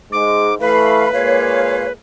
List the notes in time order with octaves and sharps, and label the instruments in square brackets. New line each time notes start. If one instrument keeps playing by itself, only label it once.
[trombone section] G#2 G#3 [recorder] D6
[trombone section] E3 A3 [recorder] B4 [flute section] F5 B5
[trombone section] A#2 G#3 A#3 [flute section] C#5 F5